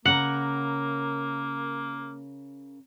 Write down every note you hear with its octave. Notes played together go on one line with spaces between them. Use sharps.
C#3 A#3 A#4 F#5 A#5